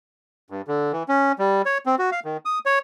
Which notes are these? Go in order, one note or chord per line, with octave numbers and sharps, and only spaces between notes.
G2
D3
E3
C#4
G3
C#5
C4
F#4
F5
D#3
D#6
C#5